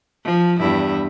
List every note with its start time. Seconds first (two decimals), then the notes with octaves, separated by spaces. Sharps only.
0.24 F3
0.58 E2 G2 E4